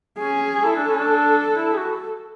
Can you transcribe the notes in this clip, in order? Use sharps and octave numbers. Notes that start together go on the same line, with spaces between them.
C#4 G#4
E4 A4
D4
C#4
D4
E4
G#4
F#4